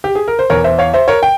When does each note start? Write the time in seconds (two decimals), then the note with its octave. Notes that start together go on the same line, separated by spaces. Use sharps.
0.04 G4
0.15 G#4
0.28 A#4
0.39 C5
0.50 E2 E3 A#4 C#5
0.64 C5 E5
0.79 C#5 F5
0.94 C5 E5
1.08 A#4 C#5
1.23 G5